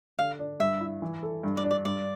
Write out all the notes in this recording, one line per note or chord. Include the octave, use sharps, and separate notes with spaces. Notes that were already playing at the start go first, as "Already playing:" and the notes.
D3 F5
D4
G2 E5
E4
E3
A4
G2
D5
D4
D5
G2 D5